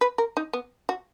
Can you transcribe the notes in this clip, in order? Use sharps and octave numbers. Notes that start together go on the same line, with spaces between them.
B4
A#4
D#4
B3
F#4